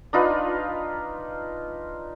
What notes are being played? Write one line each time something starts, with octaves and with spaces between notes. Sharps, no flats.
D4 D#4 F4 B4